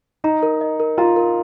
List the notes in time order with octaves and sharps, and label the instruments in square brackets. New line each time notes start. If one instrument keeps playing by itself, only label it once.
[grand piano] D#4 [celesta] A#5
[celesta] A#4
D#5
A#4
[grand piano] F4 [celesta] A#5
[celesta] A#4